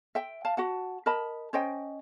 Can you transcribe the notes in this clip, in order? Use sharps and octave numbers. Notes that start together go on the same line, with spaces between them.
E5 G5
F5 A5
F#4 F#5 A5
A#4 D#5 A5 B5
C#4 C5 D#5 G5